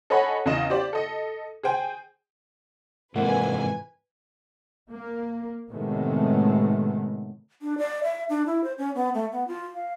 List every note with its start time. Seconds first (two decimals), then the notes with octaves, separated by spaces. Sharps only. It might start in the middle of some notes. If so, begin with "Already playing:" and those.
0.10 A4 C#5 D#5 F#5 G#5 B5
0.46 E2 C#3 D#5 E7
0.70 G4 C5 D5
0.93 A4 D#5
1.63 G#4 C5 G5 G#5
3.16 F2 G#2 C3 E3 A#3 B4 F#5 G#5
4.90 A#3
5.70 A2 C3 D#3 G#3 A3 B3
7.62 D4
7.78 D5
8.04 E5
8.29 D4
8.46 E4
8.64 C5
8.78 C#4
8.95 B3
9.14 A3
9.32 B3
9.48 F4
9.75 F5